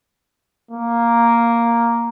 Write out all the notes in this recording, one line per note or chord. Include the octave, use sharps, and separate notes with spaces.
A#3